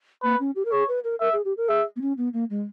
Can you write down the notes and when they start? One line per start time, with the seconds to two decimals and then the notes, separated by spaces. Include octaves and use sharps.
0.23 A#3 B4
0.40 C#4
0.55 G4
0.65 A#4
0.72 G#4 C#5
0.88 B4
1.04 A#4
1.20 A#4 E5
1.33 G#4
1.45 G4
1.57 A#4
1.69 G#4 E5
1.96 B3
2.01 C#4
2.17 B3
2.33 A#3
2.50 G#3